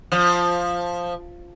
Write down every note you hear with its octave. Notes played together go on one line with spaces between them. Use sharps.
F3